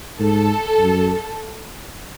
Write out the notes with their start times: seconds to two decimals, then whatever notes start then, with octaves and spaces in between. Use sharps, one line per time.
0.19 G#2 A4
0.80 F#2